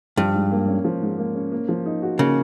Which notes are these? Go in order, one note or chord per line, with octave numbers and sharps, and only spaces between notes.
G2 F3
G#2
A#3
C#4
F3
G#2
A#3
C#4
A#3
F3
D#4
F#4
C#3 A#3